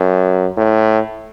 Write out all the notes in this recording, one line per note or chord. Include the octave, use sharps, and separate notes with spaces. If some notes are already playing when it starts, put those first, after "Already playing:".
Already playing: F#2
A2